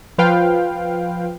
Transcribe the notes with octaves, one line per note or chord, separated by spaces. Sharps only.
F3 F4 B4 F5 G5